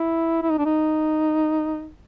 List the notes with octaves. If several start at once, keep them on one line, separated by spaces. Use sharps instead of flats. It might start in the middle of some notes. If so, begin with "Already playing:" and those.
Already playing: E4
E4
D#4
D4
D#4